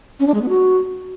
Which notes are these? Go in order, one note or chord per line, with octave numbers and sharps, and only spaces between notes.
C#4
D4
G#3
B3
F#4